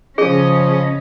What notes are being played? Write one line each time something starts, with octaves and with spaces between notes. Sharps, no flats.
C#3 F3 C#4 G#4 D#5